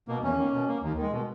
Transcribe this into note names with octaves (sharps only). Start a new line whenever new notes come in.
B2 A#3
E2 C#4
D#3 A#3
B2
A#3
D#2
D#3 G#3
B2